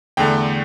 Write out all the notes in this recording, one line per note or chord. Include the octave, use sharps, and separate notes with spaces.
E2 D3 A3 G5